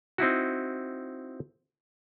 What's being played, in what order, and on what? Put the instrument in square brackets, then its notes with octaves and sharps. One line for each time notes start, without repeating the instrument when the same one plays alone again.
[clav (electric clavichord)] C4 D#4 E4 F#4